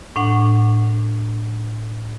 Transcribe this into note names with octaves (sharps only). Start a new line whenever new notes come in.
A2 D4 F#5